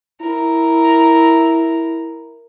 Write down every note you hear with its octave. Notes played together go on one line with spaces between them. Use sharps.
E4 A#4